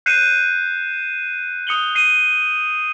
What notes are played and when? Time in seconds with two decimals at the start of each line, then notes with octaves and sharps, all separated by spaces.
0.06 F#6 G6 C7 C#7 D#7 E7
1.67 D#6 C#7 F#7 G7
1.95 C7 D#7